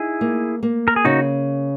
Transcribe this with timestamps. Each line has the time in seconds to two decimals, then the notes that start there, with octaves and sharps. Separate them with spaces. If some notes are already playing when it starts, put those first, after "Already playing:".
Already playing: D#4 E4 G#4
0.21 A#3
0.63 A#3
0.88 A#4
0.96 G#4
1.05 C#3 D#4 F#4